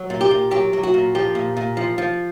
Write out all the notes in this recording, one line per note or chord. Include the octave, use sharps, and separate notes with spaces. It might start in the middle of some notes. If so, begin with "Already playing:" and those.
Already playing: F#3
A#2
G4
A#2
F#3 G4
F#3
F#4
A#2
F3 G4
A#2
A#2
F3
F3